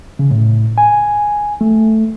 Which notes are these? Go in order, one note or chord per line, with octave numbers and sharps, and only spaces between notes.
C#3
A2
G#5
A3